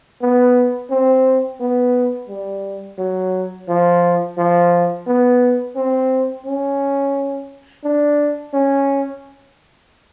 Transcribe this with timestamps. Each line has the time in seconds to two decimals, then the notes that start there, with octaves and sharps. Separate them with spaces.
0.22 B3
0.90 C4
1.60 B3
2.29 G3
2.98 F#3
3.68 F3
4.38 F3
5.07 B3
5.76 C4
6.46 C#4
7.84 D4
8.54 C#4